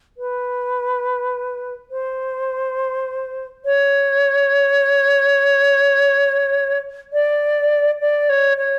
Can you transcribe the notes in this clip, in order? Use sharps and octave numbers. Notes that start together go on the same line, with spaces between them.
B4
C5
C#5
D5
D5
C#5
C#5